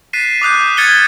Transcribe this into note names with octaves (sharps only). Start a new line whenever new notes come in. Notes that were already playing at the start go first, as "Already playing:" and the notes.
F#6 A6 B6 C7 D#7 E7
D6 D#6 F#6 G6
F6 G#6 A6 C#7 D#7 G7